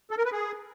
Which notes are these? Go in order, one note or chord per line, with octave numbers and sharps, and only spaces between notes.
A4
A#4
B4
G#4